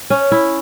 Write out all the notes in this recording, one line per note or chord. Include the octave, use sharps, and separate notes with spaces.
C#4
E4